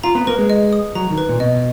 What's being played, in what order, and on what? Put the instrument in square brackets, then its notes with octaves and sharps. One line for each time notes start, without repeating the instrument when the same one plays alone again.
[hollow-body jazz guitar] F4 [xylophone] A#5
[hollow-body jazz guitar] B3
[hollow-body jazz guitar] A#3 [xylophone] B4
[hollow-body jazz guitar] G#3
[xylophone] D#5
D#6
[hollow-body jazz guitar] F#3 [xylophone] A#5
[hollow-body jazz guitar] D#3
[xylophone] B4
[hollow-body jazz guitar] A#2
[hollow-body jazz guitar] B2 [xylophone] D#5